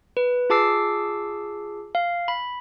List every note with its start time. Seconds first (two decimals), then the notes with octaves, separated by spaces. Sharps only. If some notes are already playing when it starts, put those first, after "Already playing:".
0.17 B4
0.50 F4 G#4 A5 D6 E6 C7
1.95 F5
2.28 B5